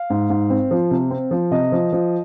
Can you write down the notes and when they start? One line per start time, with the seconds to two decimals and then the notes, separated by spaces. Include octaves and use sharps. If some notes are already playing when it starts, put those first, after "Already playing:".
Already playing: F5
0.10 G#2
0.30 G#2
0.50 C4
0.71 F3
0.91 C3
1.11 C4
1.31 F3
1.51 C3 D#5
1.72 F3
1.93 F3